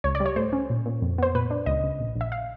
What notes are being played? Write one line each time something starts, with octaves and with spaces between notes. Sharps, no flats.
C#2 C#5
D5
G3
C#5
A2 C5
C#4
A#2
A#2
F2
B3 C5
A#2 B4
D4
C#2 D#5
C#2
A#1
A#1
E5
F5